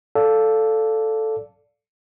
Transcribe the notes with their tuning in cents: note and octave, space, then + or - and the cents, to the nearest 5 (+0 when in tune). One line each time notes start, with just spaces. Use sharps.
A4 +0 D5 -15 F5 +0